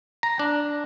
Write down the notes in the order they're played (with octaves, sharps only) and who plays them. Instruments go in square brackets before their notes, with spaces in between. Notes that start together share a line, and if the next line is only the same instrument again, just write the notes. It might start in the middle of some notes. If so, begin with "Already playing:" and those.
[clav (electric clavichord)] A#5
D4